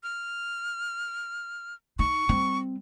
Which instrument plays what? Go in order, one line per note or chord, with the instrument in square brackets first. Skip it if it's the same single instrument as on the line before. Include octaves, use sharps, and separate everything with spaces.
[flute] F6
[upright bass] D#4 [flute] C#6
[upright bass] G3 C4